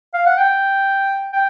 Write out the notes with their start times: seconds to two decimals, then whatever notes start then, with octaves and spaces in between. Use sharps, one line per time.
0.14 F5
0.26 F#5
0.37 G5
1.33 G5